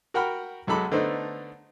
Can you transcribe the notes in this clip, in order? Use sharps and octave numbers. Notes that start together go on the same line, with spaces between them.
F#4 A#4 F#5 G5 B5 F6
B1 F#3 G#3 A4 B5 D6
D3 A3 B3 D#4 C5